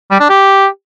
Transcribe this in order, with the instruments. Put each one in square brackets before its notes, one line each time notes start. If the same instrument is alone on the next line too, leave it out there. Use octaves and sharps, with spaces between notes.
[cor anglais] G3
D4
G4